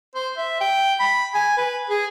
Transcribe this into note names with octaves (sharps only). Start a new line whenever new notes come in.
C5
E5
G5
B5
G#5
B4
G#4